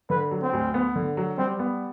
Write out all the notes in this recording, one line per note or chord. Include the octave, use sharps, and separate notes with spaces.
D3 B4
F#3
C4
D2
B3
D3
F#3
G3 C4
B3